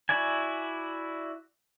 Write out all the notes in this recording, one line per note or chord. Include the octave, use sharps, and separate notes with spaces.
E4 F#4 D5 G#5